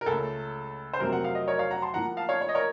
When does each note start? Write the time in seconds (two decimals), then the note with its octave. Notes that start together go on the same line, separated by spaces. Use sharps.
0.01 A#4
0.06 C#2 C#3 A3 A4
0.93 C5
1.00 F2 C3 F#3 A3 C4 A#4
1.12 F#5
1.24 F5
1.35 D#5
1.48 A#4 C#5
1.58 C#5 F5
1.71 F#5 A#5
1.82 A5 C6
1.94 A2 F3 A#3 F#5 A#5
2.17 F5 A5
2.29 C#5 F5
2.41 C#5
2.49 D#5
2.55 A#4 C#5